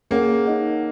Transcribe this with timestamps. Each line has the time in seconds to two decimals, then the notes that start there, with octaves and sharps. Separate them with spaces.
0.11 A#3 C#4 G#4 C#5 F#5
0.47 D#4 A#4 D#5 F#5